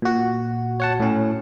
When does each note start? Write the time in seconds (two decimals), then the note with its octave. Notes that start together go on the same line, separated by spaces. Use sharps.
0.02 A#2 F#4
0.80 C#5 F#5 A5
1.00 A2 C#4